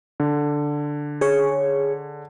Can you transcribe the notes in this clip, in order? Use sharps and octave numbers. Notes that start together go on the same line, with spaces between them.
D3
G#4 C#5